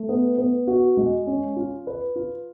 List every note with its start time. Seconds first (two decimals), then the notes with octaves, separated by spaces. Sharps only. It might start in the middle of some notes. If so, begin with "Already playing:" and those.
Already playing: A3
0.09 B3
0.38 B3
0.67 F#4
0.97 G#3
1.27 C#4
1.57 F4
1.87 B4
2.16 F4